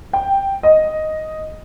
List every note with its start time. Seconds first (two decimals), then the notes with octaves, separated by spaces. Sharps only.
0.13 G5
0.63 D#5